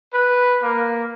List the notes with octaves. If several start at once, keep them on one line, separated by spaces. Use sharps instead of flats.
B4
A#3